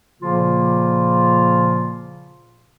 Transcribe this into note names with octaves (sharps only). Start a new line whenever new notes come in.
A#2 C#3 F3 A#3 F4